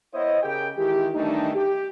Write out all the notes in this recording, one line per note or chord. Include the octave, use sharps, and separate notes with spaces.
B3 E4 C5 C#5 D#5
C#3 G4 G#4 A#4 G5
D#3 E3 G#3 E4 G4
D#3 E3 G3 A3 D4 D#4
G4